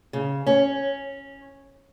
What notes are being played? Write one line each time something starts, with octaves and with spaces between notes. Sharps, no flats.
C#3
C#4